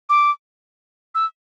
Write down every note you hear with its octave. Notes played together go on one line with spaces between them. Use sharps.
D6
E6